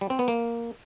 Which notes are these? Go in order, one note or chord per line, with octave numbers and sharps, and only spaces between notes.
G3
C4
B3
A#3